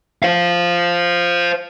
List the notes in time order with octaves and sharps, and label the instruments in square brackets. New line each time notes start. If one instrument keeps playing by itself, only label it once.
[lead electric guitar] C5 F5